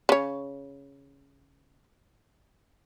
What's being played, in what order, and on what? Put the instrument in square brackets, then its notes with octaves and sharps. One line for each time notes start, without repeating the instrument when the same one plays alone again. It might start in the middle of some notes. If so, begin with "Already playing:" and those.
[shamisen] C#3 C#5